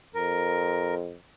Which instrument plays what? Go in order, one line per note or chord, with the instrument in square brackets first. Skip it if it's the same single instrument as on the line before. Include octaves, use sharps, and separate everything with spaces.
[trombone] F2 [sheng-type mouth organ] A#4